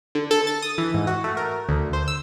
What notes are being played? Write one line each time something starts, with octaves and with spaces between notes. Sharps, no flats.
D3
A4
A6
D#6
E3
G#2
F#4
A3
A#4
D2
C5
E6